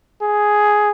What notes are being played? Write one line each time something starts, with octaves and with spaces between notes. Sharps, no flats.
G#4